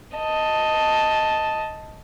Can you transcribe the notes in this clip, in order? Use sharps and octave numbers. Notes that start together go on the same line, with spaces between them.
D#5 A5